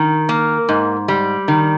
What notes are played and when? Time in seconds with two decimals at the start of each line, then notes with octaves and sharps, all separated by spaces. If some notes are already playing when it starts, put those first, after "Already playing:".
Already playing: D#3
0.29 A#3
0.69 G#2
1.08 G3
1.48 D#3